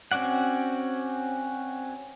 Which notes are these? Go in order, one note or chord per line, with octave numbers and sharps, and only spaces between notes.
C4 C#4 F#4 D5 F#5